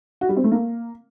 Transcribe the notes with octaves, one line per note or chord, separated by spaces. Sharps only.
F#4
G3
C4
A3
A#3